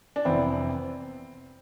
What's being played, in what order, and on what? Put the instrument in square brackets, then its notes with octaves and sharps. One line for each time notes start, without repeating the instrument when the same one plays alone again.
[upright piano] D4
[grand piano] F1 F2 E3 B3 E4 [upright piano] C4